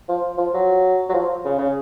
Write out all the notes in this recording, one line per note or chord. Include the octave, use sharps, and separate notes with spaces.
F3
F3
F#3
F#3
F3
C#3
C#3